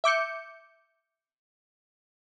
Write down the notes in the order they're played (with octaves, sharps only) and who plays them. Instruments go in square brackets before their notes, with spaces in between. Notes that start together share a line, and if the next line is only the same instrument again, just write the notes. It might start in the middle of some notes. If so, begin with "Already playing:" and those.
[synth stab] E5 D6 G6 C#7